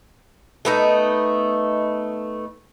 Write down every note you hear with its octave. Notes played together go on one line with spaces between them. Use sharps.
A3 B3 D#4